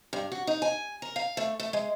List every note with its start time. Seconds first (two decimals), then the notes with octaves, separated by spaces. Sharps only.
0.13 G2
0.32 F#4
0.47 D#4
0.62 G#5
1.02 A#4
1.16 F5
1.37 A3
1.60 A3
1.73 G#3